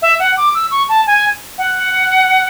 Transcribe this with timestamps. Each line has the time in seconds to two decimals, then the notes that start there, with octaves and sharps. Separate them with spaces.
0.02 E5
0.19 F#5
0.37 D6
0.54 E6
0.71 C#6
0.89 A5
1.06 G#5
1.58 F#5